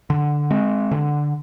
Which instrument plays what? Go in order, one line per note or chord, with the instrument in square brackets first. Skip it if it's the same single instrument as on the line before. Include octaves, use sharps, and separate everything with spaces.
[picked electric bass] D3
G#3 C4
D3